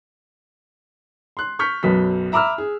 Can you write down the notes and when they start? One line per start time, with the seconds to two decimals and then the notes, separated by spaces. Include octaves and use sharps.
1.37 C6 F#6
1.59 C#6 F6 G6 B6
1.83 B1 F#2 B4 B6
2.32 E5 A#5 B5 D6 E6 F6
2.58 G#4